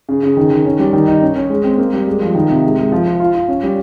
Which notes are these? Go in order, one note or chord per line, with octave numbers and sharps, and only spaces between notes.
C#3
C#3
D#3
D#3
C#4
G3
D#3
D#4
C#4
C#4
G#3
C4
A#3
G3
G#3
F3
D#3
C3
G#3
G#3
F3
F3
F4
F4
C#4
G3